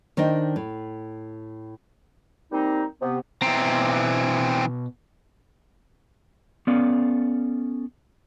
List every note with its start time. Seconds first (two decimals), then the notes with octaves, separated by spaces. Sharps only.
0.17 D#3 D4 C5 D#5 G5 A5
0.56 A2
2.52 F3 G3 A#3 C4 D#4
3.01 C3 B3
3.42 B2 E3 C4 A#5
6.67 B3 C#4 A4 D5 F5